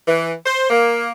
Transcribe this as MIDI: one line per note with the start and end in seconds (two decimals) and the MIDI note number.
0.07 0.32 52
0.46 0.68 72
0.70 1.12 58